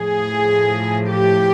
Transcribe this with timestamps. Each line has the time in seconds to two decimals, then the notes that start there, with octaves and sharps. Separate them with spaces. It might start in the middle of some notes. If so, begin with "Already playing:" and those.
Already playing: A2 F3 G#4
1.10 G4